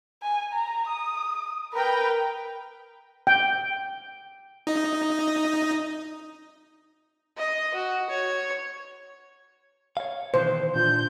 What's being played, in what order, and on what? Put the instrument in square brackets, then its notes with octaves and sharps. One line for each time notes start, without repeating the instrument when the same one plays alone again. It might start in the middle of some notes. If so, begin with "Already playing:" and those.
[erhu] G#5
A#5
D#6
[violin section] A#4 G5 [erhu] B4
[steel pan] G5
[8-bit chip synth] D#4 D#5
[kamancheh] D#5
F#4
C#5
[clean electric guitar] C#5 F5
[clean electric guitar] B2 D#3 E3 [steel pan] C5
[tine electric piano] A#2 D4 F4 [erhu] G6